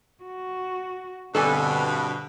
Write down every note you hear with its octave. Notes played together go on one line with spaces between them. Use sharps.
F#4
G2 B2 D3 C4 A4 D5 G#5